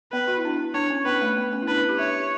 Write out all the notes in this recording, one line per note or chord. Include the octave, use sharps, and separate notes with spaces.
B3 B4
F#4
E4
D4
E4
D4 C#5
C#4
B3 B4
A3
B3
C#4
E4
D4 B4
E4
G4
C#5 E5